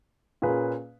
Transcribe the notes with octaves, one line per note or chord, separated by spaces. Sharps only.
A#2 A#3 C#4 G#4 B4